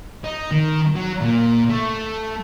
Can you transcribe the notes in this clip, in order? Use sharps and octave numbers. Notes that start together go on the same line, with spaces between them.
D#4
D#3
F#3
A#2
A3